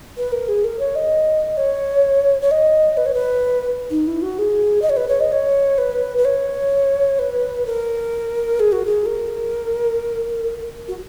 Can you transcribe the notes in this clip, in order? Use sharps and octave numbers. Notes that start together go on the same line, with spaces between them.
B4
A#4
G#4
A#4
C#5
D#5
C#5
C#5
D#5
B4
C#5
B4
D#4
E4
F#4
G#4
D#5
C#5
B4
C#5
D#5
C#5
B4
B4
C#5
B4
A#4
G#4
F#4
G#4
A#4
F#4